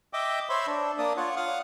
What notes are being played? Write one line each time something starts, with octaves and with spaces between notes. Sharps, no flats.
D#5 E5 G5 D6
C5 C#5 E5 B5 C6
D4
A#3 D4 D5 D#6
F4 C#5 F#5
F5 F#5 D#6